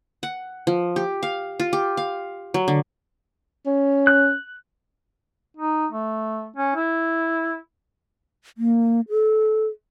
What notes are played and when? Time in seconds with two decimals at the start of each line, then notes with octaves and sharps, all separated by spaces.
0.23 F#5
0.67 F3
0.96 G4
1.23 F5
1.60 F4
1.73 G4
1.97 F5
2.54 F#3
2.68 D3
3.66 C#4
4.07 F#6
5.57 D#4
5.92 A3
6.56 C#4
6.75 E4
8.58 A#3
9.10 A4